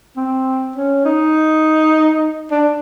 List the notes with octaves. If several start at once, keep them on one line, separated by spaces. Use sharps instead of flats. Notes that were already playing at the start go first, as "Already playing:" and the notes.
C4
C#4
D#4
D4